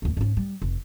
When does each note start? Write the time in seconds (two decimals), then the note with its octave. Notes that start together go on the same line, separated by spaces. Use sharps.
0.02 D#2 A3
0.17 G#2 C#4
0.37 G3
0.62 F1